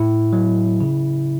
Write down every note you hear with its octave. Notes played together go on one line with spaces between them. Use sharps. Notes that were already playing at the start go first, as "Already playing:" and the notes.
Already playing: A2 E4
F#3
C#3